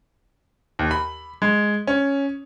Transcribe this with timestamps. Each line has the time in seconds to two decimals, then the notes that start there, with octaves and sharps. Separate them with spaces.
0.79 D#2
0.91 B5
1.42 G#3
1.87 C#4